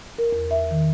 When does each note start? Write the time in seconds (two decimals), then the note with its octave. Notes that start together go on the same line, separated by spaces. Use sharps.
0.18 A#4
0.32 E2
0.51 E5
0.71 D#3